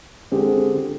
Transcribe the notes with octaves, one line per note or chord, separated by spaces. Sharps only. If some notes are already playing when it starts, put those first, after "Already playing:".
D3 G#3 C4 G4
D3